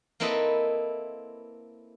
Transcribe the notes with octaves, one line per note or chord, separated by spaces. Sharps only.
A#3 C4 E4 A4 B4 D#5